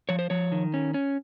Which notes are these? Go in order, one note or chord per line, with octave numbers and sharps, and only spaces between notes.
F3 C#5
C5
F3 C#5
D#3
C#4
C#4